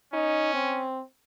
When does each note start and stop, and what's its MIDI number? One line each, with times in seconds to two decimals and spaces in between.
0.13 0.88 61
0.13 0.51 63
0.54 1.03 60